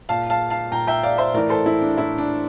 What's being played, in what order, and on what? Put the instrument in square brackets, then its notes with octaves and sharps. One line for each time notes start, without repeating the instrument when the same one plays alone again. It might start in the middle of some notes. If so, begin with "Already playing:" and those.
[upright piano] A#2 F5 A5
F5 A5
F5 A5
A#2 G5 A#5
E5 G5
D5 F5
C5 E5
A2 E3 A#4 D5
A4 C5
E4
D4
A2 E3 E4
D4